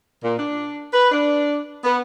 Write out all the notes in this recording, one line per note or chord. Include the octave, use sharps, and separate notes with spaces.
A#2
D4
B4
D4
B3